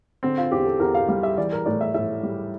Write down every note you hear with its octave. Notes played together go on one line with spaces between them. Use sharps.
D3 C4
F4
E2 G4
A4
E2 A#4
F5
G3 F5
E5
E3 D5
A#4
A2 D5
E5
A2 E5
G3